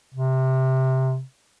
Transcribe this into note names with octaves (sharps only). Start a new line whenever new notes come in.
C3